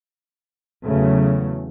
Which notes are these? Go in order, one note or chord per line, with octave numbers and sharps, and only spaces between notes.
E2 C#3 F#3 A3